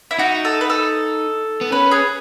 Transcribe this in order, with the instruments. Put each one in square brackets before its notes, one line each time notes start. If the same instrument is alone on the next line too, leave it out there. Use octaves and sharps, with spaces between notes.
[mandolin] E4
[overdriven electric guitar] D#4 [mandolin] F#4
[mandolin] A4
B4
A4
[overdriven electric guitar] B3
[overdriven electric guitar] C#4 [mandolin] B4
[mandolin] G#4